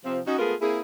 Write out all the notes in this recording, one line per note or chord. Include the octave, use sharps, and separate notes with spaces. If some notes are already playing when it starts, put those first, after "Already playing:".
C3 F3 C4
C#4 D#4 F#4
G#3 A3 B3 F4 G#4 A#4
A#3 C4 E4 G#4